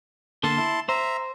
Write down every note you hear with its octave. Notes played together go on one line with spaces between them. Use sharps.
D3 A#3 A4 A5 C6
E4
C5 E5 A#5